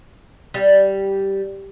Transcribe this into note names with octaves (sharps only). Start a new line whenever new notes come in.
G3